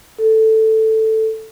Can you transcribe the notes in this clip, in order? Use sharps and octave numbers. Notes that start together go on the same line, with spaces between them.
A4